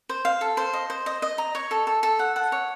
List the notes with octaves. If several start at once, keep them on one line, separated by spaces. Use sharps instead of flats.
C5
F5
A4
C5
D#5
C5
D#5
D#5
A#5
C#5
A4
A4
A4
F#5
F#5
C#5